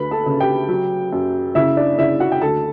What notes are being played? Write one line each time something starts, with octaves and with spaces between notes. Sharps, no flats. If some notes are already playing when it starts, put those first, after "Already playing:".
Already playing: D2 B4 B5
A4 A5
C#3
G4 G5
F#3
F#2
C#3 E4 E5
D4 D5
C#3 E4 E5
F#4 F#5
G5
D2 A4 A5